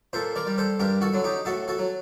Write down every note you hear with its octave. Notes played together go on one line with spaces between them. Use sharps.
A#2 A4 C5
A#4 D5
G3
A4 C5
G2 G4 A#4
F#4 A4
D3 F#3
D#4 G4
A2 F#4 A4
F#4 A4
F#3